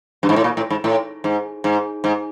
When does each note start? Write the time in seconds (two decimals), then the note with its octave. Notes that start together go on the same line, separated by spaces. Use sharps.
0.23 G2
0.29 G#2
0.36 A2
0.44 A#2
0.57 A2
0.70 G#2
0.84 A2
1.24 G#2
1.64 G#2
2.04 G#2